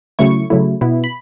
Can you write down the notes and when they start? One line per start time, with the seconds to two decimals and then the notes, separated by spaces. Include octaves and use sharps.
0.19 C#3 F#3 A3 E4 C#6
0.50 C#3 F#3 A3 E4
0.81 B2 B3 E4
1.04 B5